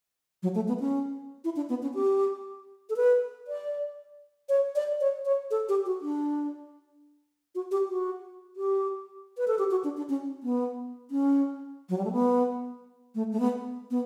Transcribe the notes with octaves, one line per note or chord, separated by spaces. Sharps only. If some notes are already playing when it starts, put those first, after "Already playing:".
F#3
A3
B3
C#4
E4
D4
B3
C#4
G4
A4
B4
D5
C#5
D5
C#5
C#5
A4
G4
F#4
D4
F#4
G4
F#4
G4
B4
A4
G4
F#4
D4
D4
C#4
B3
C#4
F#3
G3
A3
B3
A3
A3
B3
B3